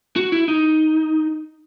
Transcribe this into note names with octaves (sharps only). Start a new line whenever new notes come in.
F#4
E4
D#4